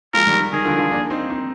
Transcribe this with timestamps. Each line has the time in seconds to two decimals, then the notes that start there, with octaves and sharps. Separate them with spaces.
0.14 F3 G#3 A#4
0.27 D#3 G3
0.40 D#3
0.53 D#3 G#4
0.65 D3 F3
0.78 D3 F3
0.91 A#3 D4
1.10 C4 D#4
1.30 C4 D#4